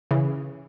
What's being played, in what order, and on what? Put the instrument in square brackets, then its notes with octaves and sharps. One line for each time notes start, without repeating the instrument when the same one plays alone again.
[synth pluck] C#3 E3